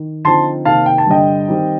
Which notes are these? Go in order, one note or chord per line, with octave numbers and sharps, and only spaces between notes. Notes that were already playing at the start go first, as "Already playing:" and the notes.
Already playing: D#3
D3 F3 C4 D#4 A5 C6
C3 D#3 A#3 D#4 F5 A5
G5
A5
G2 D3 G3 D4 D#5 G5
D#3 G3 C4 D#4